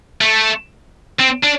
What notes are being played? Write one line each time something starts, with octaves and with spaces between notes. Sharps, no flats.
A3
C4
D4